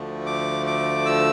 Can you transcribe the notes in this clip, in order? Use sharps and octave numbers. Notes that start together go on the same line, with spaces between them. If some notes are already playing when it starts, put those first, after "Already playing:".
Already playing: D2 D3 F3 A3
D6
D6
E6